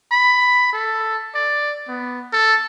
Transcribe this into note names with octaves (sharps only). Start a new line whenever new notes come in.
B5
A4
D5
B3
A4